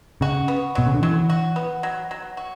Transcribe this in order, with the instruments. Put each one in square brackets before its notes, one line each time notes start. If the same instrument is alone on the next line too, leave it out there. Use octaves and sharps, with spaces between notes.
[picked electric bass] C#3 [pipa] F#4
[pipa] B3
[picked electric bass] B2 [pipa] F#3
[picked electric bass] C#3
D3
[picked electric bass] E3 [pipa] F#3
[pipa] F#4
B3
F#3
F#3
F#4